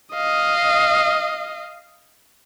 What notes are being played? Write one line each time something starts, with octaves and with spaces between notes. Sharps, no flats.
D#5 F5